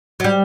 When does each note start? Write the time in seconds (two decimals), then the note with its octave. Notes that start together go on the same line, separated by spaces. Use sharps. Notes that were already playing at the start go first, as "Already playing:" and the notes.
0.20 F#3
0.24 G3